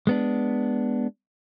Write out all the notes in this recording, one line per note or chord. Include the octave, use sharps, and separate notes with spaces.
G#3 B3 D4